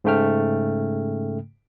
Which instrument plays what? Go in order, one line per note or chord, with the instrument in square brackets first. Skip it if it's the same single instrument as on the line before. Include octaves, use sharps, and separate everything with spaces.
[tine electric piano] G#2 C#3 A3 G5 F6